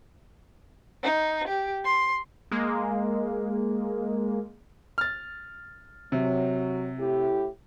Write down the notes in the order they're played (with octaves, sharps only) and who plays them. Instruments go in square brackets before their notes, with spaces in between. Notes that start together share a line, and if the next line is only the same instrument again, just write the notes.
[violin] D#4
G4
C6
[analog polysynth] G#3 A#3
[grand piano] F6 A6
[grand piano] C3 [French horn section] F#3
[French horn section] A2 E4 G4